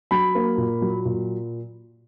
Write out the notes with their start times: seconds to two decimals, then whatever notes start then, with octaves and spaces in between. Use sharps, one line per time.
0.11 F#3 B5
0.35 A#3
0.57 A#2
0.82 F#3
1.05 A#2